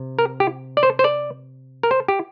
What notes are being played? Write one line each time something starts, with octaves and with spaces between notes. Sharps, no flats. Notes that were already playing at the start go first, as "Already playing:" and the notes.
Already playing: C3
A#4
G4
D5
C5
C5
D5
A#4
C5
G4